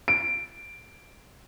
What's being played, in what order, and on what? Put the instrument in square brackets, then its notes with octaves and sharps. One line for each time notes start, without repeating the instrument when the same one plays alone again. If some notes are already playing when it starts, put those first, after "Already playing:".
[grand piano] D7